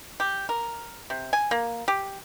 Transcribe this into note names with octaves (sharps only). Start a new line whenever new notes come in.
G4
A#4
C3
G#5
A#3
G4